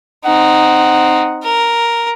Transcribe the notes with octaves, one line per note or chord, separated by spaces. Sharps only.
C4 D#4 F#5
A#4